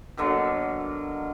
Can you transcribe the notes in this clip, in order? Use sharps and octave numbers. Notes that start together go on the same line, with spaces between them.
B2 D3 F#3 A#3